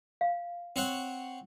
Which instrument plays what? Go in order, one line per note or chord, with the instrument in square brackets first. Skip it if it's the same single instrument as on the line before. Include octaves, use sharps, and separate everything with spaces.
[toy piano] F5
[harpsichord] C4 C#5 F#5